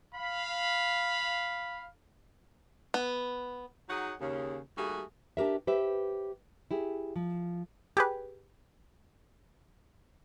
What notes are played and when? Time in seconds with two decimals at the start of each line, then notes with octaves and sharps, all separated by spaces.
0.15 F5 B5
2.94 B3
3.89 F#3 D#4 G#4 C#5 F#5
4.21 D#2 C#3
4.77 D#2 G3 A3 F#4 G#4
5.37 D4 G4 A#4 E5
5.67 G4 B4 C5 E5
6.71 E4 G4 G#4
7.16 F3
7.97 G4 G#4 B4